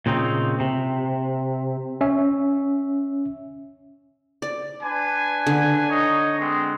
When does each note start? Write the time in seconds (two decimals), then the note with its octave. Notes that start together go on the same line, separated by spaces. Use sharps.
0.06 A#2 C#3 C4 D#4
0.60 C3
2.01 C#4 E5
4.42 D5
4.83 D4 B4 G#5
5.47 D3
5.89 D#4 C#5 D#5
6.39 G#3 B3 C4